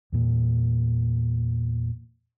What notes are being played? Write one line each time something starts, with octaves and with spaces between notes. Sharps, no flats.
E2 A#2